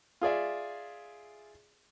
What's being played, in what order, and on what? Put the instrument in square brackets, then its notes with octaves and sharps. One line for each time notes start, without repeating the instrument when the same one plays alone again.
[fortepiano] F4 G#4 D5 E5